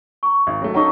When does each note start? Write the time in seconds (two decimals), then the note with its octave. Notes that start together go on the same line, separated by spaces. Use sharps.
0.23 A#5 C#6
0.47 G#1
0.62 F#3 A3
0.74 C#4 D#4 A4 F#5 A#5 C#6